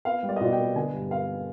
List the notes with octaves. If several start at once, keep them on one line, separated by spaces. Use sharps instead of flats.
B3 F5
G3
D5
D#5
B2 D5
G5
B3
D3 G#5
G2
B3 F5